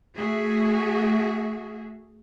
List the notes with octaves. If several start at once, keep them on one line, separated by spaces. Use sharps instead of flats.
A3 F#4 G#4 E5